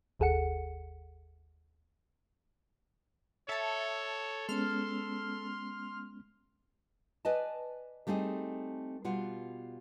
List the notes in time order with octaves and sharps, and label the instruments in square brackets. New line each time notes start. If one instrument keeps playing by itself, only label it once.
[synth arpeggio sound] G1 D#2 G#4 A4 F#5 C#7
[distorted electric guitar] A4 [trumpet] C#5 [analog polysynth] E5 A5
[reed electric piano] G#3 B3 C#4 [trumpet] C6 [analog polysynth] F6
[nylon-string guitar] B4 D5 D#5 G#5 A5
G3 A3 C4 D#4 G#4
B2 G3 F4 F#5